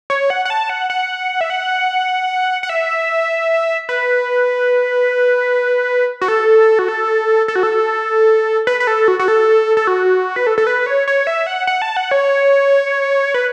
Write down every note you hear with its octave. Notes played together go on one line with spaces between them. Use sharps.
C#5
F#5
F#5
A5
F#5
F#5
E5
F#5
F#5
E5
B4
F#4
A4
F#4
A4
A4
F#4
A4
B4
B4
A4
F#4
F#4
A4
A4
F#4
B4
A4
A4
B4
C#5
C#5
E5
F#5
F#5
A5
F#5
C#5
B4